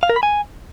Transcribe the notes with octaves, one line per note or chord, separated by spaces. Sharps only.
F5
A#4
B5
G#5